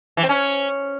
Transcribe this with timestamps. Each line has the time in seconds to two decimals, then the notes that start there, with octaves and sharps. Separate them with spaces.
0.17 E3
0.23 C4
0.29 C#4